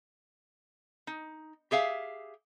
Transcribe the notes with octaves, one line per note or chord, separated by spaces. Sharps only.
D#4
G4 G#4 E5 F5